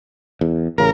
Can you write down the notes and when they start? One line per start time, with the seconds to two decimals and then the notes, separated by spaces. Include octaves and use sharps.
0.41 E2
0.78 A1 C#3 A#4